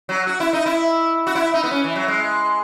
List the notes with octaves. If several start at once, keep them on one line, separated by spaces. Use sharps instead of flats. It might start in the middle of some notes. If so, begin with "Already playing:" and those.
F#3
F#4
E4
D#4
E4
F#4
E4
D#4
B3
C#4
E3
F#3
G#3